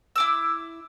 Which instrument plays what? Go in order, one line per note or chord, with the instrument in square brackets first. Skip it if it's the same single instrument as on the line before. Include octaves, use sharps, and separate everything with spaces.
[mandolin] E4 D6 E6